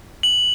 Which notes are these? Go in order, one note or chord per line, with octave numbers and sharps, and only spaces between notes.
F#7